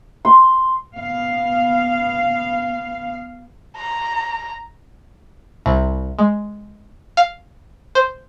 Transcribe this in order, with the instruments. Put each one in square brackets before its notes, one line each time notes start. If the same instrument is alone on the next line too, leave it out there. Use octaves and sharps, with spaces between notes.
[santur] C6
[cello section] B3 F5
[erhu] A#5
[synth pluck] C2
G#3
F5
C5